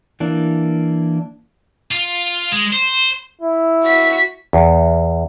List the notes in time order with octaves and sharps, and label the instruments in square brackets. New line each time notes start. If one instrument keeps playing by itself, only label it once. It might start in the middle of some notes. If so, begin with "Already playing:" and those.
[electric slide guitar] E3 A#3 D4
[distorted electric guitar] F4
G#3
C5
[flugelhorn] E4
[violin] F#4 B6
[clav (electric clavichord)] E2